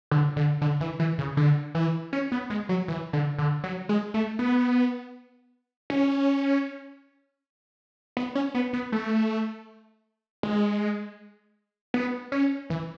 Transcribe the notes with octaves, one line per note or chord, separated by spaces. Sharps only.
D3
D3
D3
E3
E3
C#3
D3
E3
C#4
B3
G#3
F#3
E3
D3
D3
F#3
G#3
A3
B3
C#4
B3
C#4
B3
B3
A3
G#3
B3
C#4
E3